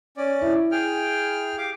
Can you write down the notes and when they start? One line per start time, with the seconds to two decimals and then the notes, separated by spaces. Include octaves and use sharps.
0.17 C#4 D5
0.41 E4
0.71 G#4 G5 F6
1.58 G4 F5 D6